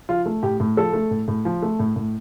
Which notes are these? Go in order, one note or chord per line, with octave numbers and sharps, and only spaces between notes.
F3 F4
A3
A2 G4
A2
F3 A4
A3
A2
A2
F3
A3
A2
A2